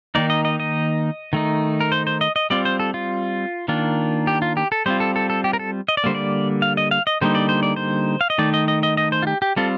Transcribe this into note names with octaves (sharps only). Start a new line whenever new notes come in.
D#3 A#3 D#4 D5
D#5
D#5
D#5
D#3 A3 D#4
A#4
C5
C5
D#5
D#5
G3 C4 F4 D5
C5
A4
F4
D#3 A#3 D4 F4
G4
F4
G4
A4
G3 C4 F4 C5
A4
A4
A4
G4
A#4
A4
D#5
D5
D3 G3 A#3 C5
D5
F5
D#5
F5
D#5
D3 G3 A#3 D#4 C5
D5
C5
D5
C5
F5
D#5
D#3 A3 D#4 D5
D#5
D#5
D#5
D#5
C5
F4
G4
G4
G3 C4 F4 A4